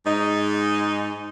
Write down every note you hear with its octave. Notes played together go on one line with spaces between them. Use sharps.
G#2 D#4